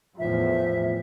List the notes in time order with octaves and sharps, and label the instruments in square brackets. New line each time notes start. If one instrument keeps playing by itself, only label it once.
[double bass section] E2 A2 [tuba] F3 [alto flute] E5